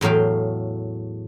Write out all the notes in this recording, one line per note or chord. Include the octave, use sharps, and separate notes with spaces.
E2 A2 F#3 F5 G5